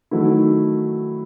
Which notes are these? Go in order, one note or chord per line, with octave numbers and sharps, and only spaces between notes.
D#3 F#3 A3 E4